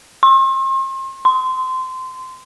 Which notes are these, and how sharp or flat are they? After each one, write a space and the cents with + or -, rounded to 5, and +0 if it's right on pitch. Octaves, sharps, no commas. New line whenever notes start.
C6 +40
C6 -20